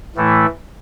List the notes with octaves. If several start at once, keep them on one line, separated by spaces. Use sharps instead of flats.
A2 E3 A3 E4